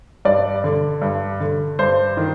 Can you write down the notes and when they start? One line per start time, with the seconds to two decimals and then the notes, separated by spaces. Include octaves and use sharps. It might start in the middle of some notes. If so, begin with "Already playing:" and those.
0.25 G2 D5
0.64 D3
1.02 G2
1.40 D3
1.79 G2 C5
2.17 D#3